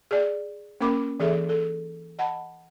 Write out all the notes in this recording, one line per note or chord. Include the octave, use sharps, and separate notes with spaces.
G#4 D5
A#3 C#4 A#4 B5 D6
E3 G#4 A4 E5
A4
D#5 F#5 A5 B5